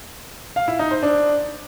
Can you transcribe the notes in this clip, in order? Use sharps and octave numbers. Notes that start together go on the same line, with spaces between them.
F5
E4
D#4
C5
D4